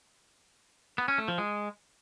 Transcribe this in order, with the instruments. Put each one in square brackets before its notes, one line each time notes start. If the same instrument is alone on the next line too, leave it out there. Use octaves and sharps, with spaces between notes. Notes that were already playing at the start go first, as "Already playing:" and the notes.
[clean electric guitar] B3
C#4
A3
F3
G#3